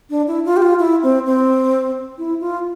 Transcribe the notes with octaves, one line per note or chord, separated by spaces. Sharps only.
D4
E4
F4
G4
F4
E4
C4
C4
E4
F4